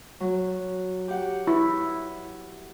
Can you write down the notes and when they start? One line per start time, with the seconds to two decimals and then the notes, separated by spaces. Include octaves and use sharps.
0.20 F#3
1.08 G4 F#5
1.47 E4